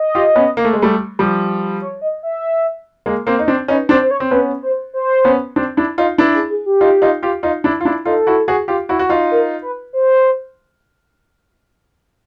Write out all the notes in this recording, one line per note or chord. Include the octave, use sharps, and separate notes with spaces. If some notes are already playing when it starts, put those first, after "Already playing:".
Already playing: D#5
F4 G4
B3 C#4
A#3
A3
G#3
G3 A3
F3 G3
C#5
D#5
E5
G#3 A#3
A#3 C4
D#4
C4 D4
C#4 D#4 B4
C4 D4 C5
C5
C#5
C4
B3 C#4 B4
C5
C5
B3 C#4
C4 D4
D4 E4
D#4 F4
D4 E4 B4
G#4
G#4
G4
D#4 F4
D#4 F4
F4 G4
D#4 F4
D4 E4
F4
D4 E4
D#4 F4 A4
E4 F#4
F#4 G#4
F4 G4
E4 F#4
F#4
D#4 F4
A#4
B4
C5